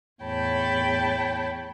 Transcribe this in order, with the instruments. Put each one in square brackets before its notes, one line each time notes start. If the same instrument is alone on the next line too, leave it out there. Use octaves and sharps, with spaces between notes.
[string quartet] E2 A2 C#5 G5 A5 B5